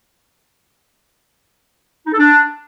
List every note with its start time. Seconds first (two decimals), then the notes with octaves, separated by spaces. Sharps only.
2.06 D#4
2.12 A4
2.18 D4